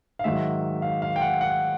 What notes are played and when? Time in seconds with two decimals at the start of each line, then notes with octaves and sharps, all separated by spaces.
0.19 F5
0.24 G#2 D#3 F#3 E5
0.82 F5
1.02 F5
1.16 G5
1.22 F#5
1.41 F#5